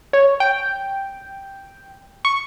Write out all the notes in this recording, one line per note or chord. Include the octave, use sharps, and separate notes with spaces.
C#5
G5
C#6